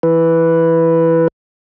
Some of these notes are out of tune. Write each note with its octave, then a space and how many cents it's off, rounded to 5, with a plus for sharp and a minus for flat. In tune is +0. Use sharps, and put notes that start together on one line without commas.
E3 +0 B4 +0